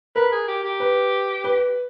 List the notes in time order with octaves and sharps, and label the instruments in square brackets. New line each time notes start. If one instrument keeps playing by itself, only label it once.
[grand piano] A#4 [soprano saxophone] B4
[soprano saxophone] G#4
G4
G4
[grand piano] B4
B4